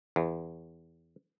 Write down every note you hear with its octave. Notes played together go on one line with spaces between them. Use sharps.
E2